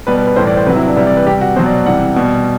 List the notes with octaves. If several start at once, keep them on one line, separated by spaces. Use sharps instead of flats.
B2 G3 B4
B4
B4
A2 E3 G3 C5
D5
C5
C3 F#3 B4
E4
D4
C3 E3 G3 E4
D5
B4
C3 G3 G4
F#4
B2 F#3 C5
D5
C3 E3 G3 F#5
B2 G3